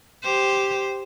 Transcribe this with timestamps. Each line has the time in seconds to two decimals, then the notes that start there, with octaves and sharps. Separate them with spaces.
0.23 G4 C5